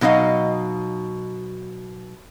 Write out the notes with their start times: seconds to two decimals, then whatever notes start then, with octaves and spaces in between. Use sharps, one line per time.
0.01 B2 F#3 D#4 D#5 F5